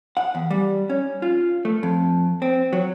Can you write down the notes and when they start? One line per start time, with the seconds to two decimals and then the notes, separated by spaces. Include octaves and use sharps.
0.17 F#5
0.35 E2
0.51 G3
0.90 C#4
1.22 F4
1.65 A3
1.83 F2
2.42 C4
2.73 F#3